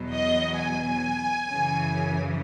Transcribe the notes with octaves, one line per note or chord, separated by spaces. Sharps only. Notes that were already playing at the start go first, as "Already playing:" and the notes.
Already playing: E2 B2 F#3
D#5
G#5
F#2 C#3 E3